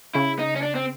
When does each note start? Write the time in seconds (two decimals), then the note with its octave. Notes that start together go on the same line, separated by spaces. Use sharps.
0.15 C#3 E4
0.39 D#4
0.56 C#4
0.62 D4
0.75 C4